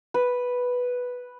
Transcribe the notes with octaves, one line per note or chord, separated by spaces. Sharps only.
B4